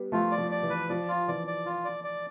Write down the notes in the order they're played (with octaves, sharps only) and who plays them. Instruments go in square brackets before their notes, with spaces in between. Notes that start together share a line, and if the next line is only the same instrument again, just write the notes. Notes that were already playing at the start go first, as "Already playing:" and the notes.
Already playing: [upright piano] G3 B3
[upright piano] F3 A3 [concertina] F4
[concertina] D5
[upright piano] F3
[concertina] D5
[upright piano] E3
[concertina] B4
[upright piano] F3 [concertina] D5
[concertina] F4
[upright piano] E3 [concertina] D5
[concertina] D5
F4
D5
D5